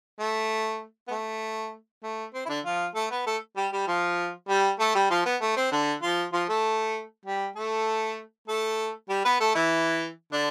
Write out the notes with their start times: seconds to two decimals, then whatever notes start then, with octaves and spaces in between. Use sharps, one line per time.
0.20 A3
1.08 B3
1.11 A3
2.03 A3
2.34 C4
2.46 E4
2.49 D3 D4
2.65 F3 F4
2.95 A3 A4
3.11 B3 B4
3.26 A3 A4
3.56 G3 G4
3.72 G3 G4
3.88 F3 F4
4.49 G3 G4
4.80 A3 A4
4.95 G3 G4
5.11 F3 F4
5.26 B3
5.41 A3
5.57 C4
5.72 D3 D4
6.03 F3 F4
6.33 F3 F4
6.49 A3 A4
7.25 G3 G4
7.56 A3 A4
8.48 A3 A4
9.10 G3 G4
9.25 B3 B4
9.40 A3 A4
9.55 E3 E4
10.33 D3 D4